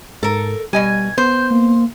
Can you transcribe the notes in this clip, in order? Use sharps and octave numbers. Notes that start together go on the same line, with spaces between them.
G#2 A4 A#4
B2 G3 D#5 G#5 G#6
B3 C5 G6
A#3